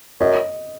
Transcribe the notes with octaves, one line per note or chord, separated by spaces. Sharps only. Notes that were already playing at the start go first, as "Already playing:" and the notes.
F#2 D#5